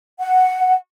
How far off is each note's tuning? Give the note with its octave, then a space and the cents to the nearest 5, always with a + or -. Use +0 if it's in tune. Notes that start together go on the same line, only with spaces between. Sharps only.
F#5 +0